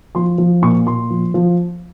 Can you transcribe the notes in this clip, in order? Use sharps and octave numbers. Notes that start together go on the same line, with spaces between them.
F3 C6
F3
A#2 C#6
A#2 C6
F3
F3